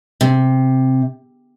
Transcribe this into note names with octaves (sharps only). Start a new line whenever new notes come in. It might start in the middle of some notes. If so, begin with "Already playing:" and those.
C3